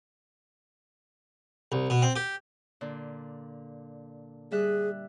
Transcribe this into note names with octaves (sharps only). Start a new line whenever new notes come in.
C2
B2
C4
G4
A#2 D3
G3 G#4 E5 F#6